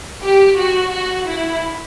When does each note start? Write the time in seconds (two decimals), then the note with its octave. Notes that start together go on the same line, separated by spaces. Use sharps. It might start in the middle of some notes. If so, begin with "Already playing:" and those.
0.22 G4
0.57 F#4
0.93 F#4
1.28 E4